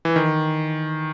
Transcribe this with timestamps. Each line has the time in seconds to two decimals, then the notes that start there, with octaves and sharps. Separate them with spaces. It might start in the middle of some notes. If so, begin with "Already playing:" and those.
0.05 E3
0.16 D#3